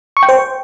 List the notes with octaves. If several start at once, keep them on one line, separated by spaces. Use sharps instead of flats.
C#6
G5
C5